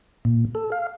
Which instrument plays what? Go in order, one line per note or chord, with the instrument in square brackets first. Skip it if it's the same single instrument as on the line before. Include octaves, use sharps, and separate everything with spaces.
[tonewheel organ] A#2
A4
F5